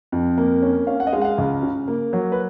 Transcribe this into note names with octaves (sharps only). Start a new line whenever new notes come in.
F2
A#3
C#4
C#4 F5
F#5
D#5
G#3 F5
F#5
F5
C#2
C#3
A#3
F#3
B4